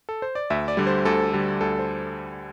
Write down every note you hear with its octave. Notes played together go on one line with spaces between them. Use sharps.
A4
C5
D5
D2 E5
D5
D3 G3
C5
D2 A4
D3 G3
D2 A4
C5